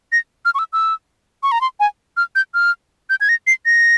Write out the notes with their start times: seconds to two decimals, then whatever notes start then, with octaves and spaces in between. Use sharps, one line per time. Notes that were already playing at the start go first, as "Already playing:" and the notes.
0.12 A#6
0.45 F6
0.55 C#6
0.59 E6
0.73 E6
1.43 C#6
1.52 A#5
1.61 C6
1.80 G#5
2.17 F6
2.36 G6
2.54 F6
3.10 G6
3.21 G#6
3.29 A#6
3.47 C7
3.66 A#6